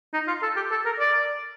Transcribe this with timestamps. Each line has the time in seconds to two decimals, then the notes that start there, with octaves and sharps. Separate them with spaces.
0.13 D#4
0.28 F4
0.43 A4
0.56 G4
0.71 A4
0.86 A#4
1.00 D5